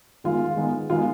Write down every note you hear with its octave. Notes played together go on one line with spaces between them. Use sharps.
D#3 G#3 B3 F4
D#3 G#3 B3
D#3 G#3 B3 F4